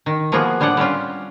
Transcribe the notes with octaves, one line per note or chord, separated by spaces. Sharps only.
D#3
F3 A#3 B3 F#4 G#4
A2 G3 D4 G#4 D5 F#5
G3 C4 C#4 F4